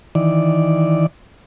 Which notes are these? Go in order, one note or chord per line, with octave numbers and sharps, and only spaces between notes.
D#3 E3 D5